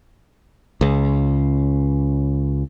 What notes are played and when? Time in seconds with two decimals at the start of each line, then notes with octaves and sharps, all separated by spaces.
0.81 C#2 C#3